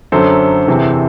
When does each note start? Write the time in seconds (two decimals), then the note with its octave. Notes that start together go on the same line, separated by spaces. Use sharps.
0.12 F#2 D3 F#3 A4 C5
0.68 E2 C3 E3